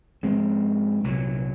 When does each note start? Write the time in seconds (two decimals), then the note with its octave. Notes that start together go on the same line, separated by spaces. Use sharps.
0.23 G#2 F3 G#3 C4
1.04 C2 A#2 F#3